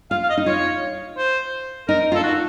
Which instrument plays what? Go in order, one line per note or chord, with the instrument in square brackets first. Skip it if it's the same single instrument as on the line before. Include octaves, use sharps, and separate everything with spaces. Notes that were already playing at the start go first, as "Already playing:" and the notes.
[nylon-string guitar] F4 [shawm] F5
[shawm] F5
D#5
[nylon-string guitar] D#4
[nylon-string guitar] F4 [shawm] C#5
[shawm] C5
[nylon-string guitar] D#4 [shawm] A#4
[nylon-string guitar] F4 [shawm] A4
[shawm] F#4